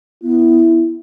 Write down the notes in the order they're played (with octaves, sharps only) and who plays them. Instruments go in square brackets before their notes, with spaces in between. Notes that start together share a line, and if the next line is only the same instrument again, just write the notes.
[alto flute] B3 [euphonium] E4